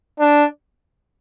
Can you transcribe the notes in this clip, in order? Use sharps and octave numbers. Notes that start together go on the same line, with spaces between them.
D4